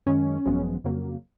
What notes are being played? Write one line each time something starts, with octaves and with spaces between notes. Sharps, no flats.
F#2 D#3 G#3 C#4
G#1 F#2 F3 G#3 B3
F2 C#3 F#3 A#3